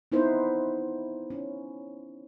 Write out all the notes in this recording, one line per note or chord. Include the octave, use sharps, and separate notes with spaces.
B3 C4 D#4 E4 B4 C5
C#4